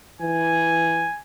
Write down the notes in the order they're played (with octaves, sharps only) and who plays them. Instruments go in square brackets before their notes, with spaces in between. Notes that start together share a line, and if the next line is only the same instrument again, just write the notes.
[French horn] E3 [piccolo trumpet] G#5